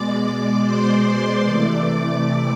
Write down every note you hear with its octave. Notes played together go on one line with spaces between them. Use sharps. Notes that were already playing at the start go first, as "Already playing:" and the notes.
Already playing: B2 G#3 D5 D6
C5 C6
C3 E3 A3 D5 D6